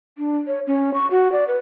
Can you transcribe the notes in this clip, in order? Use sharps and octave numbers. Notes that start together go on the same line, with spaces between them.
D4
C#5
C#4
C#6
F#4
D5
B4